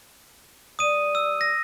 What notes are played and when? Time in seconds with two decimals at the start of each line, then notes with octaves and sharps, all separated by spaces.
0.79 G3 D5 D#6 D#7
1.15 E6
1.41 A#6